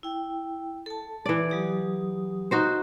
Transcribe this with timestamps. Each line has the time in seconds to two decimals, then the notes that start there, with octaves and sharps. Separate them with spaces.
0.03 E4 G5
0.86 A4 A5
1.26 E3 D5
1.50 F#3 G4 D#6
2.51 D#4 F#4 C5